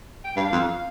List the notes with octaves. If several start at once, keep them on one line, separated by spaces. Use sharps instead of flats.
G5
G2 F5
F2
F5